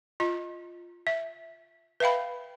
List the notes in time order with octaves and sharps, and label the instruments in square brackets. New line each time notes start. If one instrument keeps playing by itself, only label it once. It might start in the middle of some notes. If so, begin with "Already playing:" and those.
[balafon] F4 D#5 A#5
E5
B4 E5 F5 G5 B5